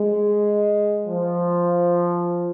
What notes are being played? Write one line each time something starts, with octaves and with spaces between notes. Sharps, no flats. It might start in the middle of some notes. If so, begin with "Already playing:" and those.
Already playing: G#3
F3